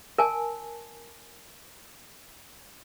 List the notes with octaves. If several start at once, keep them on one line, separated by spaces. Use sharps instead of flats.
A#4 G#5 A5